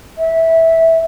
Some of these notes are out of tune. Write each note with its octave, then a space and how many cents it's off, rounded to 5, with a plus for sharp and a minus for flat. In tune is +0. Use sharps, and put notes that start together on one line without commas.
E5 -10